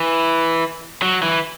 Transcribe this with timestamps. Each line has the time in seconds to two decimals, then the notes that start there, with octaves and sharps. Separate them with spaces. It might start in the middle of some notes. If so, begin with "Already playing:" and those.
Already playing: E3
1.02 F#3
1.23 E3